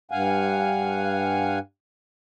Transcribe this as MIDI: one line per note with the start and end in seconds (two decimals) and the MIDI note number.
0.11 1.59 43
0.11 1.59 77
0.11 1.59 78
0.11 1.59 80